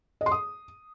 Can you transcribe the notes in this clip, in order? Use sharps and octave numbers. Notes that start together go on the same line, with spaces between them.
D#5
C6
D#6